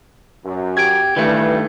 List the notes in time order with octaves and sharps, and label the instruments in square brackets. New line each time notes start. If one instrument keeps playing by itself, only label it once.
[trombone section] F#2
[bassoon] G4 [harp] G#6 D7
[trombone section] G2 [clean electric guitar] D#3 A3 [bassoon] E3